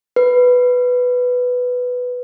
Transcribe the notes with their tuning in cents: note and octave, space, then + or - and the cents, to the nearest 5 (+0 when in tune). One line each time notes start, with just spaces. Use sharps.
B4 +5